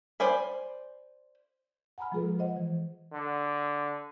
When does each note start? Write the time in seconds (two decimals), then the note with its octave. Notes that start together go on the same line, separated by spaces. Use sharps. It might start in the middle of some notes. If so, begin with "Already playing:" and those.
0.20 C5 D5 G#5 B5
1.98 F#5 G#5 A#5 B5 F6
2.12 F3 G#3 F4 G#4 A4 B4
2.39 C5 D#5 F#5
2.57 E3
3.13 D3